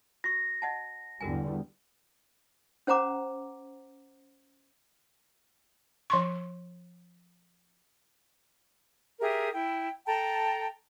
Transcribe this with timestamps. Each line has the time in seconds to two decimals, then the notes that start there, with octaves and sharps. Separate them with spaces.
0.24 F#4 C#6 A#6
0.62 D#5 F#5 A5
1.21 E2 D3 G3 F#4 A#4 G#5
2.87 C#4 C5 F#5 A#5 D6
6.10 F3 C6 C#6
9.21 G4 G#4 A#4 E5
9.52 E4 G5
10.06 A4 G5 A5 A#5